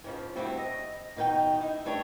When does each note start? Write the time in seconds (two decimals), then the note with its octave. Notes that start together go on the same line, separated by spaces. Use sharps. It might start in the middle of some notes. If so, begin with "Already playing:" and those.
0.04 G#2 C#3 F3
0.35 G3 A3 C4 D4 E4 F#4
0.58 D#5
1.17 B2 D#3 D#4 B4 G5
1.60 D#4 E4
1.85 G3 A3 D4 C#5